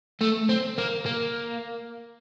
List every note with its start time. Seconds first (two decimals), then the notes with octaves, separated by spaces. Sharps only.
0.21 A3
0.49 C4
0.78 A#3
1.06 A#3